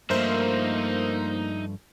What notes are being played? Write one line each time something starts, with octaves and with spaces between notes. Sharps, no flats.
G2 F3 A3 A#3 D#4 A#4 C5 E5